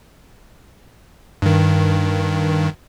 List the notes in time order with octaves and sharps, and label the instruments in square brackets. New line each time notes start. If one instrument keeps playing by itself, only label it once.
[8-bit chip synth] G2 D#3